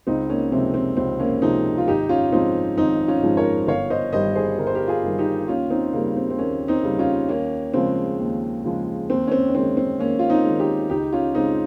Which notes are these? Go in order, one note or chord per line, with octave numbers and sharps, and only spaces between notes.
C#2 C4 D#4
A#3 C#4
C3 F3 G#3 C4
C4
C#2 C4
A#3 C#4
C3 F3 G#3 C4 D#4
F4
G#1 D#4 G4
C#4 F4
G#2 F3 G#3 C4 D#4
G#1 C4 D#4
C#4 F4
G#2 F3 G#3
A#4 C#5
G1 C#5 F5
C5 D#5
G2 D#3 G3 C5 D#5
G#4 C5
G1 A#4
C5
G4 A#4
F4 G#4
G2 D#3 G3
D#4 G4
D#2 C#4 F4
C4 D#4
C#3 G3 A#3
C4
C4
D#2 A#3 C#4
C4 D#4
C#3 G3
C#4 F4
D#2 A#3 C#4
C#3 F3 G#3 C4
D#2
C#3 F3 G#3
D#2 C4
C#4
C4
C#4
D#3 G#3 C4
C4
D#2 A#3 C#4
F4
C4 D#4
G#3
D#3
D#4 G4
C#2 D#4 G4
C#4 F4
C#3 G#3 C4 D#4